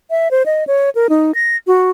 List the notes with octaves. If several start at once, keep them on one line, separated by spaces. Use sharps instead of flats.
E5
C5
D#5
C#5
A#4
D#4
A#6
F#4